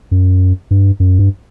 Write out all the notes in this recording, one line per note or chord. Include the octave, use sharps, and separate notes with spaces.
F#2
G2
F#2
G2